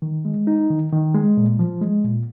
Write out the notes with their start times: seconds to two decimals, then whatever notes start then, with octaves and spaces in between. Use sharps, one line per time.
0.02 D#3
0.25 G#3
0.47 D#4
0.70 D#3
0.92 D#3
1.14 G#3
1.37 A#2
1.59 F3
1.81 G#3
2.04 A#2